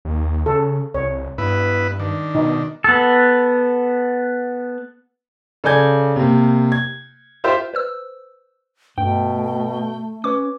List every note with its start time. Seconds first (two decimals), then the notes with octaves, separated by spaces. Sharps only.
0.05 D#2
0.46 C#3 A4
0.94 C2 C#5
1.38 G2 B3 E4 B4
1.99 D#3 D4
2.35 B2 D#4
2.84 B3 A4
5.64 C#3 A4 D5 G#5 G6 G#6
6.16 C3 A#3
6.72 G#6
7.44 F4 G4 C5 E5 G5
7.74 B4 C5 E6
8.98 G2 B2 A3 G5
10.24 C#4 B4 D6